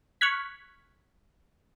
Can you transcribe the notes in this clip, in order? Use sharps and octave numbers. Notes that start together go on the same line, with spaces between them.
C#6 F6 F#6 G#6 B6